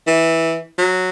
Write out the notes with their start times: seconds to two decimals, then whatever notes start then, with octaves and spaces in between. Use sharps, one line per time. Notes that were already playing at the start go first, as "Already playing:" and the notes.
0.07 E3
0.78 F#3